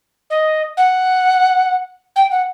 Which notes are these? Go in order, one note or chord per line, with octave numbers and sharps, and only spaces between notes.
D#5
F#5
G5
F#5